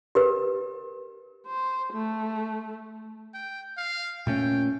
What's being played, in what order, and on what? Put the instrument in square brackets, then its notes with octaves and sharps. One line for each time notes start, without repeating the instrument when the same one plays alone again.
[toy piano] G4 A#4 B4
[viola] C5
A3
[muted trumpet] G5
F5
[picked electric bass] A#2 A3 C#4 [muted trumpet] G5